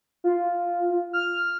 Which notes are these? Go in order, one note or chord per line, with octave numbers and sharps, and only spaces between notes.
F4
F6